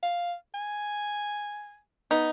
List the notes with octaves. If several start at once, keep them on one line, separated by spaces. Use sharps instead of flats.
F5
G#5
B3 D#4